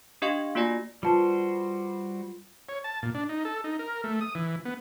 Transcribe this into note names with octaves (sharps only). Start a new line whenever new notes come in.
D4 G4 D#5 F5 C#6
A#3 F4 F#4 D5 G#5 A#6
G3 F4 F#4 B4 C5 A5
C#5
A5
A#2
D4
D#4
A4
D#4
A#4
A3
D#6
E3
B3